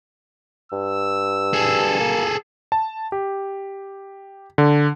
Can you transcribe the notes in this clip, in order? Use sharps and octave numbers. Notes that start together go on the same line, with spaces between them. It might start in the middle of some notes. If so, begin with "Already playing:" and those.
G2 E6
G#4 A4
A#3
A5
G4
D3